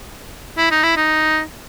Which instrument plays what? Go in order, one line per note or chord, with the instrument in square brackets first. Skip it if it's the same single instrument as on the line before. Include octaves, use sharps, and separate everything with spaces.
[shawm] E4
D#4
E4
D#4